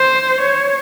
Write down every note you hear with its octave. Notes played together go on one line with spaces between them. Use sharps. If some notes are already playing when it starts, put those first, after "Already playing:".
Already playing: C5
C#5